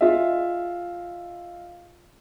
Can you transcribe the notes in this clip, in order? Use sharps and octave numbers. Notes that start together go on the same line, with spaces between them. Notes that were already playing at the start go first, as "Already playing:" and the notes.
F4 G#4 D#5 E5